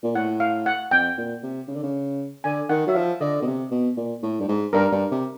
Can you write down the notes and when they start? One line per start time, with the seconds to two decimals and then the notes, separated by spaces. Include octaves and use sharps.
0.03 A#2
0.15 A2 F#5
0.40 F5
0.66 F#5
0.91 F2 G5
1.17 A#2
1.43 C3
1.68 C#3
1.75 D3
1.83 C#3
2.44 D3 G#5
2.69 D#3 F#5
2.87 F#3 E5
2.94 F3 F5
3.20 D3 D#5
3.42 B2
3.46 C3
3.71 B2
3.97 A#2
4.22 A2
4.40 G2
4.48 G#2
4.73 G2 A#4
4.92 G2
5.11 C3